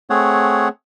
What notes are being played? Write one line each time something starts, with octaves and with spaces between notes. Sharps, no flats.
A3 C4 G#4 C#5 F#5